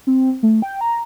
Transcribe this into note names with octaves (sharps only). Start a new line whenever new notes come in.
C4
A3
G5
A#5